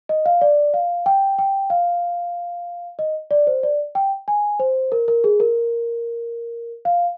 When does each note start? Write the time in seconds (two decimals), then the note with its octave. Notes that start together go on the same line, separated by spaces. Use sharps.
0.09 D#5
0.26 F5
0.41 D5
0.74 F5
1.06 G5
1.38 G5
1.70 F5
2.99 D#5
3.31 D5
3.47 C5
3.63 D5
3.95 G5
4.28 G#5
4.60 C5
4.92 A#4
5.08 A#4
5.24 G#4
5.40 A#4
6.85 F5